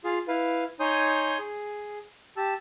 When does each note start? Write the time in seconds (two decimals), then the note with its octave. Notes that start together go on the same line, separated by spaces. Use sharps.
0.04 F4 G#4 F5
0.28 E4 B4 F5
0.80 D#4 C#5 G#5 C6 D#6 G6
1.39 G#4
2.37 G4 A5 E6